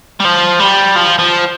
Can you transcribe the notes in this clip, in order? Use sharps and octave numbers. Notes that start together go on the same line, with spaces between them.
G3
F3
G3
F3
F3